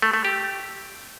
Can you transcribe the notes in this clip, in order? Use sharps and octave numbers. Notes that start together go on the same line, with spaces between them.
A3
A3
G4